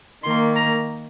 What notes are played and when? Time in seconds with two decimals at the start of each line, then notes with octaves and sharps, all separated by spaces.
0.23 D#3 A#3 C6
0.55 A#5